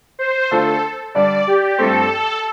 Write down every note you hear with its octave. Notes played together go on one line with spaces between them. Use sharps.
C5
D3 A3 F4 A4
D3 G3 D4 D5
G4
G2 F3 A3 C4 A4